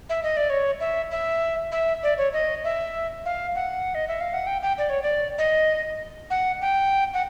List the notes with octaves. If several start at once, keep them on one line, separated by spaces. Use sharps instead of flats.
E5
D#5
D5
C#5
E5
E5
E5
D5
C#5
D#5
E5
F5
F#5
D#5
E5
F5
F#5
G5
G5
D5
C#5
D5
D#5
F#5
G5
F#5